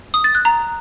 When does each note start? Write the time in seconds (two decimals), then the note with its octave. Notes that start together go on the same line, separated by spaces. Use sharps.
0.14 D#6
0.24 A6
0.35 F#6
0.45 A#5